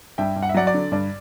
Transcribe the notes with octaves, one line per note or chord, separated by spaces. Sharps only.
G2 E5 G5
G2
F#5
E5
F#3 D5 F#5
D5
D3
G2 D5